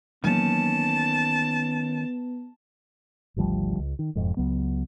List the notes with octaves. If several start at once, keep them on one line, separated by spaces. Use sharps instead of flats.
D#3 E3 F#3 A#3 B3 C#4 A5
G#1 D2 F3 G3
C#2
D#3
E1 F2 G#2
C#2 F#3 B3